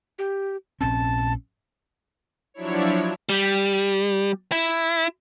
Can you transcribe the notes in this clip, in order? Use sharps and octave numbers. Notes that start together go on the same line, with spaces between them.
G4
A#1 C4 C#4 A5
F3 F#3 D4 E4 C#5
G3
E4